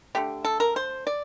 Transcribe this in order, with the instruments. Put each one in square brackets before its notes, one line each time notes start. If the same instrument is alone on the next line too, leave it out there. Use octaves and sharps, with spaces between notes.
[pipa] D3 A3 G4
A4
A#4
C5
D5